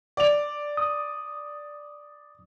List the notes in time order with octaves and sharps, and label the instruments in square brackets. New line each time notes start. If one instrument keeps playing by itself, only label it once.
[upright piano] D5 F7
[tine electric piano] D#6